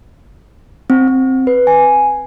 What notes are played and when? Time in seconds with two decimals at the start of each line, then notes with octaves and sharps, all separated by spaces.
0.90 C4
1.08 C4
1.47 B4
1.67 G#5